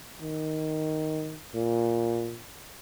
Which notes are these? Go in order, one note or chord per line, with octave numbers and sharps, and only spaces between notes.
D#3
A#2